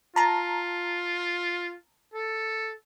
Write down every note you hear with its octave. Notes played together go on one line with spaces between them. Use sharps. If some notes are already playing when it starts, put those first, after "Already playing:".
F4 A5 A#5
A4